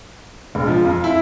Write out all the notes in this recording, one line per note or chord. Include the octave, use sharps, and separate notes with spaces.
E1
F3
F2
E4